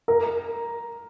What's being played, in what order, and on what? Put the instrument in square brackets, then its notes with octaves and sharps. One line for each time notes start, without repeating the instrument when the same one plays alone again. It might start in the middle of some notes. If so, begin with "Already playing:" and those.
[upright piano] A#4